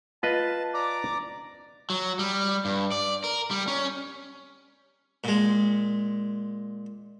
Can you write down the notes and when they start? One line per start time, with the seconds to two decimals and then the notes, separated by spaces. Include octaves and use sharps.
0.23 F4 B4 D#5 A5
0.74 D5 A#5 D6
1.90 F#3
2.19 G3
2.65 G2
2.92 D5
3.24 A#4
3.51 G3
3.68 C#4
5.24 A#2 G#3